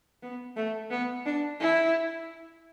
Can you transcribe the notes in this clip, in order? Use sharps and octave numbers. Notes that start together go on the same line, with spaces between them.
B3
A3
B3
D4
E4